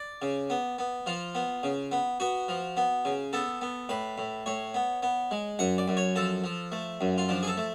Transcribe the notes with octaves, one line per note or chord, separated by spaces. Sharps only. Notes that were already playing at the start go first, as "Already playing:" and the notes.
Already playing: D5
C#3
B3
B3
F3 F4
B3
C#3
B3
B3 F#4
F3
B3
C#3
B3 A4
B3
A2 B4
A2
A2 C#5
B3
B3
G#3
F#2 F#5
D5
F#2
C#5
F3 A4
F3
A3
F#2
F4
F3 D4
G#4
A4
A3